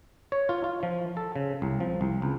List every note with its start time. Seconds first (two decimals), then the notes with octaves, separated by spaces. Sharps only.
0.32 C#5
0.49 F4
0.64 F4
0.83 F3
1.17 A4
1.36 C#3
1.62 C2
1.80 F3
2.01 C2
2.22 C#2